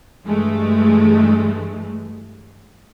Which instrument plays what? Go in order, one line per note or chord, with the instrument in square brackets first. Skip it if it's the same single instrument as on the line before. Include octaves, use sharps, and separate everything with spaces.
[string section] G2 E3 G#3 A3